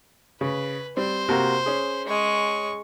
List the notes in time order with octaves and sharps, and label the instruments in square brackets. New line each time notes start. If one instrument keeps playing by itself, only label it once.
[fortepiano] C#3 [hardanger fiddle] B4
[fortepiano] G3 C4 [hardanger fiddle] C5
[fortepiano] C3 A#3 F#4
C#4 G#4
[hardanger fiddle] G#3 C#6